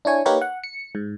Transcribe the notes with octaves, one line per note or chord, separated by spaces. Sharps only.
D4 E4 C#5 G#5
A#3 D#4 G4 A#4 B4 C#5
F#5
C#7
G#2